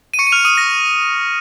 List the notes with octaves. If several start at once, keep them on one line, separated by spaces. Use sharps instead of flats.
D#7
C#6 C#7
D#7
F6 F7
D#6 D#7
A#6